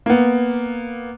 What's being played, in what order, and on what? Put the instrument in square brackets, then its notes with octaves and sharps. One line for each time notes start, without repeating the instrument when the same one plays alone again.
[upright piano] A#3 B3